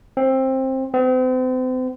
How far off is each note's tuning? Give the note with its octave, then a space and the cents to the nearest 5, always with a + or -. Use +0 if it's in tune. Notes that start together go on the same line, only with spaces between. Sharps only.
C4 +15
C4 -40